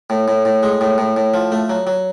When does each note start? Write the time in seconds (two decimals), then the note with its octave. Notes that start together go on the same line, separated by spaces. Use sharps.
0.10 A2
0.28 A2
0.45 A2
0.63 G#3
0.81 A2
0.98 A2
1.17 A2
1.34 F3
1.52 A3
1.70 F#3
1.87 F#3